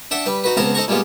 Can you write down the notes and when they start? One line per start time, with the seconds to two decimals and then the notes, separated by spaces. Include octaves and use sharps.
0.11 D4 E5 F#5 G5
0.26 G3 B4
0.44 D#4 F#4 B4
0.57 C#2 B3 C4 F5 A5 A#5
0.75 D#4 A4 C5 A#5 C#6
0.88 A#2 G3 G#3 B3 F4